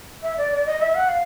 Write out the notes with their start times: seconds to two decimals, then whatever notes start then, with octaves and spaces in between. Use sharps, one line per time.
0.23 E5
0.37 D5
0.52 D5
0.66 D#5
0.80 E5
0.95 F#5
1.09 F5